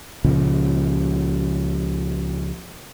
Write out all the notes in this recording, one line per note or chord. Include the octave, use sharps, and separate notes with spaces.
C#2 A#2 C#3 F3